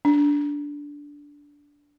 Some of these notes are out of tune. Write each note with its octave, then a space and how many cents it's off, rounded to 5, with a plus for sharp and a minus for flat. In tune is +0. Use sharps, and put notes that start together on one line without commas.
D4 -15